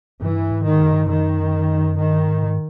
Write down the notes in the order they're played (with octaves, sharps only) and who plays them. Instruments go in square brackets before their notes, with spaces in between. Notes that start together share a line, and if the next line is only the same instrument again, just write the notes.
[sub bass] G2 [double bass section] E3
[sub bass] G#2
[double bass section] D#3
[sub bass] F#2
G2
[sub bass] F#2 [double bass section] D#3
[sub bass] G2 [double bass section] D#3
[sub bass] G#2